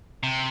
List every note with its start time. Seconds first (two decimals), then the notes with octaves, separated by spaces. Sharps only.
0.23 C3